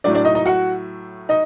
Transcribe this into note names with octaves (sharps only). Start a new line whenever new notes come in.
A2 F#3 A3 D4 D5
D4 D5
D#4 D#5
D#4 D#5
F#4 F#5
D#4 D#5